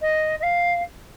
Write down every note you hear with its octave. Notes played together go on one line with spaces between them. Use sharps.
D#5
D#5
F5